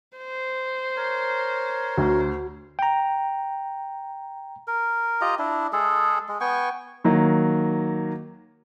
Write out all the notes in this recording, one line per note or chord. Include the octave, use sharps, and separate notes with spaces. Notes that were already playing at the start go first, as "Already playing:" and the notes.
C5
A#4 C#5
D2 F#4
G5 A#5
A#4
F4 G4 D#5 A#5
D4 E4
G#3 G#4 A4
G#3
B3 G5 G#5 C#6
D#3 F#3 A#3